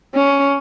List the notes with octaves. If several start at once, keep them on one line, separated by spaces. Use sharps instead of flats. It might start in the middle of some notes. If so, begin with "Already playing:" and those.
C#4